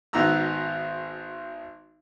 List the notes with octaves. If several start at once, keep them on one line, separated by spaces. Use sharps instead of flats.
G#1 B3 D#4 F#4 A#5 E6